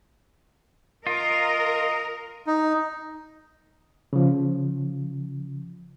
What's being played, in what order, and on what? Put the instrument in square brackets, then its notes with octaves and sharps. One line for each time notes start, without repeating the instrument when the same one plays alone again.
[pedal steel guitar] F4 [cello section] A#4 [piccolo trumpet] D#5
[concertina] D#4
[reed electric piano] C#3 F3